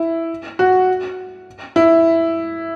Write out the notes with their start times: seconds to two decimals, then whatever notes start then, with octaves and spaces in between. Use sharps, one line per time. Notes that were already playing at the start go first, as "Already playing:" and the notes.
Already playing: E4
0.59 F#4
1.76 E4